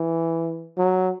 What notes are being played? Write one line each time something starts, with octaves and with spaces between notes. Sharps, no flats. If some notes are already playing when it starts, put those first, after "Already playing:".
Already playing: E3
F#3